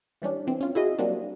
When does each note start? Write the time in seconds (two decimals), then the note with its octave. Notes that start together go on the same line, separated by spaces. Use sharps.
0.22 E3 G3 C#4 D4
0.47 E3 C4
0.61 C#4 F4
0.75 E4 F#4 G#4 D#5
0.98 F#3 G3 A#3 C4 D4